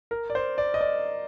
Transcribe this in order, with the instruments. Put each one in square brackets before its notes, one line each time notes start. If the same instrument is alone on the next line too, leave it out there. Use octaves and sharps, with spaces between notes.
[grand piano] A#4
D5
C5
D5
D#5
D5